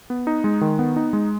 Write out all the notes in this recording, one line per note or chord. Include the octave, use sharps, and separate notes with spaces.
B3
D#4
G#3
D#3
B3
D#4
G#3